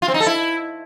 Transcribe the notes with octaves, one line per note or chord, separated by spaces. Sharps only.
F4
C4
D#4
A4
E4